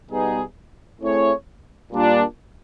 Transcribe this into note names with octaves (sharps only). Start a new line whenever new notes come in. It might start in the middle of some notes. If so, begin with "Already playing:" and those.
B2 G3 B3 D#4 G#4
A3 C4 E4 G#4 C#5
A#2 G3 A#3 D4 F4